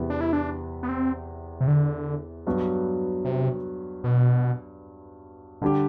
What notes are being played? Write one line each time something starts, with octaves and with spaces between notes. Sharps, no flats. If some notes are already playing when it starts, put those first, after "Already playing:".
Already playing: E2 C3 E3 B3
D4
E4
D4
B3
C4
C3
D3
G2 F#3 B3 F#4
C3
B2
G2 D3 G3 D4 G4